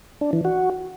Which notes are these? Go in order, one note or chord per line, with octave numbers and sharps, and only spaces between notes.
D4
E3
F#4